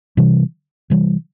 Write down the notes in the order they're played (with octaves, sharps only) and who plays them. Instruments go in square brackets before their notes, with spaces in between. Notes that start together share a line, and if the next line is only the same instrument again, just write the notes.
[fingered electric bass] C3 E3 G3
C3 E3 G3